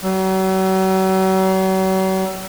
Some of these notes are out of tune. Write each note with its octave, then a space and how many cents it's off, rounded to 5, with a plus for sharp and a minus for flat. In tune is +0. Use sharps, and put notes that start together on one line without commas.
F#3 +40